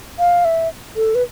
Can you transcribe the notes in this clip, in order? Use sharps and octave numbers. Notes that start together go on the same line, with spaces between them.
F5
E5
A4
B4